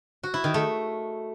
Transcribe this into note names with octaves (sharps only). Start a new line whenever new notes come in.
F#4
E4
D#3
A3